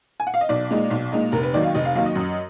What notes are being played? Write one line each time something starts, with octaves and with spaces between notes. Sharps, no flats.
G#5
F#5
F5
D#5
B1 D5
A#2 G#3 D#4
B1
A#2 G#3 D#4
F1 A#4
B4
D#2 D#3 F#3 D5
F5
F1 D#5
F5
D#2 D#3 F#3 F5
D#5
F#2